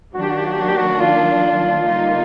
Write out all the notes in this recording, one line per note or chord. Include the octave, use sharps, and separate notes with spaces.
D#3 F#3 A#3 D4 F#4
G4
F#4
G4
F#4
G4
F#4
G4
F#4
F4
D3 G3 A#3 D#4